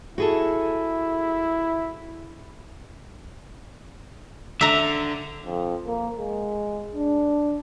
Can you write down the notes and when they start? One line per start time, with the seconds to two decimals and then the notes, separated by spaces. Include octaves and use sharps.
0.18 E4 F#4 G#4 A4
4.61 D3 E5 A#5
5.46 F2
5.87 A#3
6.18 G#3
6.95 D4